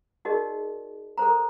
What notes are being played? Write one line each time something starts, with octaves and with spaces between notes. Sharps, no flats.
D#4 F#4 G#4 A#4 D5 D#5
A4 A#4 C5 A#5